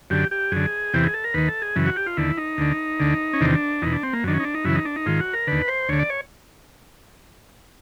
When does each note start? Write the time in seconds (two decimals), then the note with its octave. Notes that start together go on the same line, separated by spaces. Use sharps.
0.10 F#2 D3 G4
0.31 G4
0.51 F#2 D3 G#4
0.93 E2 C3 E3 G4
1.04 G#4
1.14 A4
1.24 A#4
1.34 D#2 D#3 B4
1.48 A4
1.62 G#4
1.76 F#2 C#3 E3
1.86 F#4
1.96 G4
2.06 F4
2.17 D#2 D3 E4
2.37 D#4
2.58 D2 D3
3.00 D2 D3
3.33 C#4
3.41 E2 C3 D#3 D4
3.82 E2 B2 D#4
3.92 D4
4.03 C4
4.13 A#3
4.24 F#2 D#3 D4
4.34 C#4
4.40 D#4
4.44 D4
4.54 D#4
4.64 F#2 C#3 E3 E4
4.75 D#4
4.85 D4
4.96 D#4
5.06 G#2 D#3 F4
5.20 F#4
5.33 A#4
5.47 D#2 D3 B4
5.68 C5
5.89 D2 D3 C#5
5.99 D5
6.10 C#5